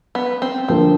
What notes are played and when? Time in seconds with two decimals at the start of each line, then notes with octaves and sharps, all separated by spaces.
0.15 B3
0.42 C4
0.68 D3 F3 A#3 C4